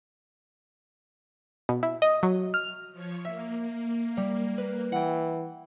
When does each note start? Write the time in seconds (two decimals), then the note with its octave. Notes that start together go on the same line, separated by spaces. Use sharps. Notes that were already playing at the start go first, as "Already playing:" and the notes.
1.69 B2
1.83 E4
2.02 D#5
2.23 F#3
2.54 F6
2.92 F3 C#5
3.25 A#3 E5
4.17 G3
4.58 B4
4.92 E3 F#5 G5